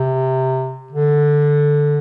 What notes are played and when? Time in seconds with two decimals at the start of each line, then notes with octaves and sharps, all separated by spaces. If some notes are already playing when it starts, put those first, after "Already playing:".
Already playing: C3
0.93 D3